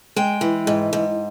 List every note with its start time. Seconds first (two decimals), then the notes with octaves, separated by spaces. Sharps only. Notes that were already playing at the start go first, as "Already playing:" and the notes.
0.16 G#3 G5
0.41 E3
0.67 G#2
0.93 G#2